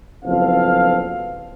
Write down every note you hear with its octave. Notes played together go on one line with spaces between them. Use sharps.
F#1 F3 B3 C4 A4 F5